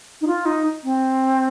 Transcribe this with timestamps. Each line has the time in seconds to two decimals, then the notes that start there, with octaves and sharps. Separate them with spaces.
0.21 D#4
0.27 F4
0.46 D#4
0.84 C4